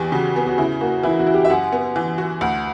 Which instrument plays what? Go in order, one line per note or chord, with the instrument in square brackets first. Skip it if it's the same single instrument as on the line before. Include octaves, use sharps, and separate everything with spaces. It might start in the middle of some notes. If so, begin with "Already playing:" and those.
Already playing: [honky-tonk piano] E2 E3 [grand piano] G4
[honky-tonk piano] C#3 [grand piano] F#4
[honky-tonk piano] B3
[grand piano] F#4
[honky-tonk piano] C#3 [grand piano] E4
[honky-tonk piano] A#3 [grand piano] F#4
[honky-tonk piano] E3 [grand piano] E4
[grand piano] F#4
[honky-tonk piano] E4
[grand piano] G4
E5
[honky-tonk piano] F#2 [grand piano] F#5
[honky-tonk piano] B3
E3
F#4
[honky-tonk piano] D2 [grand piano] F#5